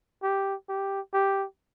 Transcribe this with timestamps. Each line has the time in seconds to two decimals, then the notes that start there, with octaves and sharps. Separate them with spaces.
0.23 G4
0.69 G4
1.14 G4